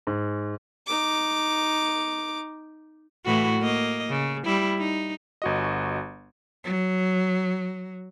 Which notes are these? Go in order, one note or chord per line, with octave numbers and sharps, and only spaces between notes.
G#2
D#4 D6
A2 E3 F#4
A#3 D#5
C#3
G3 E4
D#4
G1 F#4 D#5
F#3